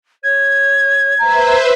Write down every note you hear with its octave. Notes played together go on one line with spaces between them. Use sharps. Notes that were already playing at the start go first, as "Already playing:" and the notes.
C#5 G#6
B4 C5 E5 A#5